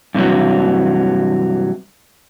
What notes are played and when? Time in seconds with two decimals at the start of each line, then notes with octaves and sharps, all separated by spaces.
0.15 G2 C3 E3 F#3